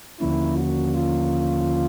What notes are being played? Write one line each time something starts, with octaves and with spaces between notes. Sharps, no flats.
D#2 D3 F3 A#3 C#4 E4
F#4
F4